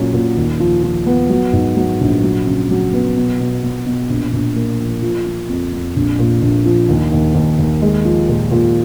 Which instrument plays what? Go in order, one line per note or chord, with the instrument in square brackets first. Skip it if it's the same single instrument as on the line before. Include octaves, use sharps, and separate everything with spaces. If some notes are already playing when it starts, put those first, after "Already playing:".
Already playing: [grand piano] A#2 F#3 C#4
A#2
D#2
F3
F3
B3
F#3
G#2
F#3
A#1
F#3
C#3
F#3
B3
B2
B2
B2
B2
A#1
A#1
A#3
F3
F3
F3
F2
F2
A#1
A#2
A#1
F3
D#2
D#2
D#2
D#2
G#3
F3
A#2
A#2